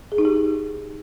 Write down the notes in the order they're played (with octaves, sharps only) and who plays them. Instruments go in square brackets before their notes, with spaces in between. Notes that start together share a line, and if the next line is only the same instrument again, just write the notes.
[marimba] G#4
D#4
G4